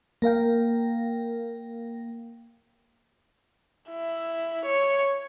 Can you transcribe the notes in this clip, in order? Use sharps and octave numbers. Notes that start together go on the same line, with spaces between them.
A#3 A#4 F5 G5
E4
C#5